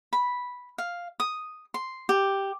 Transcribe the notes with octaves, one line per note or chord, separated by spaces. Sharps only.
B5
F5
D#6
C6
G4